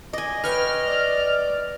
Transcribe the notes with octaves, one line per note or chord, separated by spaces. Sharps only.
D5 D#5 G#5
B4 C#5 G5 F6
D5